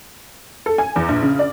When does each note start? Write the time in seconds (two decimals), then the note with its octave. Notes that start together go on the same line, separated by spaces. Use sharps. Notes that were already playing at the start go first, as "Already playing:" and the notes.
0.66 A4
0.78 G#5
0.96 E2
1.08 A#1
1.22 C#3
1.39 D5